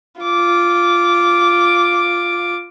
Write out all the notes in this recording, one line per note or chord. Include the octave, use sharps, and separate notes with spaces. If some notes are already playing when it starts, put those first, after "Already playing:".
F4 D6